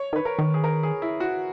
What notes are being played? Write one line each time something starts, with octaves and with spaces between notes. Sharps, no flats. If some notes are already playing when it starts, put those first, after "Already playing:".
Already playing: C#5
D#3
B4
A#4
D#3
G#4
A#4
G#4
E4
F#4